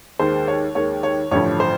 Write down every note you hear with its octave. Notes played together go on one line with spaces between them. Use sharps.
D#2 D#3 G#3 C5
C#5
D#2 D#3 G#3 C#5
C#5
A1 G2 D3 F3 C#5
C5